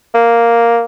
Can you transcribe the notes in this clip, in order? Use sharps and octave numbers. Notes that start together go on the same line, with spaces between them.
A#3